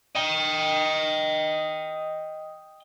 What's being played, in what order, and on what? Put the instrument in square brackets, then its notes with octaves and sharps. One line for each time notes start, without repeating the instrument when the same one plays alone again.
[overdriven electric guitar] D#5 G5